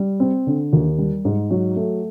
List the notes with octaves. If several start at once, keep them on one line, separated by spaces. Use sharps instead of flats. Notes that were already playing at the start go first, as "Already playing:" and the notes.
Already playing: G3
C4
D3
D#2
G3
G#2
F#3
A3